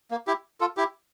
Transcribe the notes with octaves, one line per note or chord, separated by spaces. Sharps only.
A#3
E4 G4
F4 A4
E4 G4